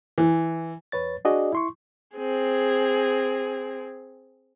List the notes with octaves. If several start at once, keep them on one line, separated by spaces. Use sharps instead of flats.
E3
E2 B4 C#5 A6
D4 F#4 G#4 D5 D#5
E4 C6 C#6
C4 G#4